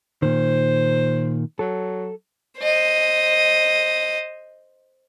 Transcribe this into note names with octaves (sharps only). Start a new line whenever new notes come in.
A#2 D#3 C5
F#3 A4
C5 D#5